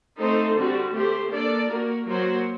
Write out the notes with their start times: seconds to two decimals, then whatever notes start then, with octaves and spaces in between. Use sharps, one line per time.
0.18 A3 C4 D#4 A4 C5
0.56 D3 G3 C4 F#4
0.93 A3 C4 G4 C5
1.31 A#3 D4 A4 D5
1.68 A#3 F#4 A#4
2.06 F#3 A#3 F#4 C5